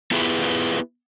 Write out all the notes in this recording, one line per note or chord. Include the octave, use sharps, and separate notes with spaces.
B3 E4 F4 G4 G#4 B4